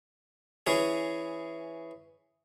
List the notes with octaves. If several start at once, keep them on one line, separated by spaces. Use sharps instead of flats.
E3 C#4 G#4